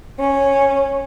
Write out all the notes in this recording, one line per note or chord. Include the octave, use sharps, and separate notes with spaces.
C#4